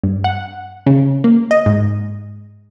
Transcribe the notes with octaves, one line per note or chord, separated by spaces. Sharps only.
G2
F#5
C#3
A#3
D#5
G#2